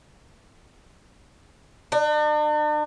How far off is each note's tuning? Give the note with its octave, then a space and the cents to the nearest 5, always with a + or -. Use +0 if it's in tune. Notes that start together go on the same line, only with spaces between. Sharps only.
D4 +45